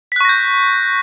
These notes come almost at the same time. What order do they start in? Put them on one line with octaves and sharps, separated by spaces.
B6 F#6 C#6 A#6 G6